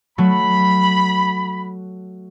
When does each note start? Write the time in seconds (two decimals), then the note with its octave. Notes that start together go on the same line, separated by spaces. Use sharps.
0.18 F#3 A3 F#4 B5